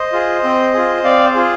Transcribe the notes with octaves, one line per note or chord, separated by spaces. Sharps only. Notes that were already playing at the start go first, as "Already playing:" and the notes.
Already playing: C5 D#5
F4 G#4
C4
F4 G#4
C4 D5 F5
C5
F4 G#4